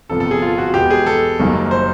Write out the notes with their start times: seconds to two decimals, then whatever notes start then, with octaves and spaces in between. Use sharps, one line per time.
0.10 G1 F2 C3 F3 A4
0.20 A4
0.31 G#4
0.42 F4
0.58 F#4
0.74 E2 B2 G#3 B3 G4
0.91 G#4
1.06 A4
1.39 F#1 F#2 D#3 G3 A#3
1.71 C5